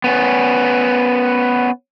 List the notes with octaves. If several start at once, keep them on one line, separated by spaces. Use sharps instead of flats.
B3 C#4